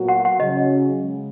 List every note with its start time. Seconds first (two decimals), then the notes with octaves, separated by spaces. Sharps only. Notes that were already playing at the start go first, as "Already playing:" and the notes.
Already playing: A#2 F#3 B3 F#4
0.08 F#5
0.25 F#5
0.40 C#3 F#3 C#4 D#5
1.01 C#3 G#3